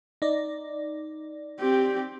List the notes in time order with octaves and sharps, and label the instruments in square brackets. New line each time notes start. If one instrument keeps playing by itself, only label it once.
[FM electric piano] D#4 D5
[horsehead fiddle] C4 G4